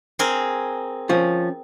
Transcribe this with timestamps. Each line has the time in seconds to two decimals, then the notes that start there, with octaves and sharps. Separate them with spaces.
0.19 C4 G#4 A#4
1.09 F3 C#4